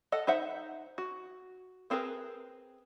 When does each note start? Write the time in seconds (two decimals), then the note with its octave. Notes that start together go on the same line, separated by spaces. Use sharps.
0.12 A4 D#5 F#5
0.27 D#4 C5 E5 F#5
0.98 F#4
1.90 B3 C4 G#4 A#4 B4